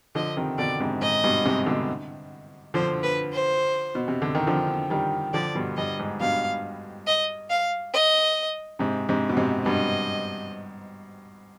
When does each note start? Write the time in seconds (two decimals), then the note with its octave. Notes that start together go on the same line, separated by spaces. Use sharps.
0.15 D3 F3 D#5
0.37 C3 D#3
0.58 B2 D3 D5
0.80 G#2 C3
1.01 G#2 D#5
1.24 G2 B2
1.45 G#2 C3
1.66 B2 D3
2.74 D3 F3 C5
3.03 B4
3.32 C5
3.95 B2
4.08 C3
4.22 D3
4.35 D#3
4.47 D3 F3
4.90 D#3 G3
5.34 D3 F3 D5
5.55 G2 B2
5.77 G2 D#5
5.99 G#2
6.20 G2 B2 F5
7.07 D#5
7.50 F5
7.94 D#5
8.79 G#2 C3
9.09 G#2 C3
9.29 B2
9.37 G#2 C3
9.66 G2 B2 D#5